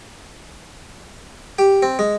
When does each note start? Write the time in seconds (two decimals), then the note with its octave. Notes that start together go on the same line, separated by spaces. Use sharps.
1.59 G4
1.83 C4
1.99 G#3